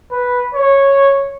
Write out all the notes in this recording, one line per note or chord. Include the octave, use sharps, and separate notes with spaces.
B4
C#5